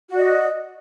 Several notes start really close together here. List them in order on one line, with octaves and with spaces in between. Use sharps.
F#4 D5 D#5